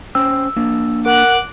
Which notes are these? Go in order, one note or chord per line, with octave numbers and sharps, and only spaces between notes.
C#4 C5 G5 E6
A#3 D4
A#4 F#5 D6 F#6